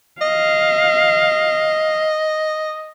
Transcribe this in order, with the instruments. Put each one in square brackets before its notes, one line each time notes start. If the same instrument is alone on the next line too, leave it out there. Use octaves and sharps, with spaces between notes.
[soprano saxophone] D#5 [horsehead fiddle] F5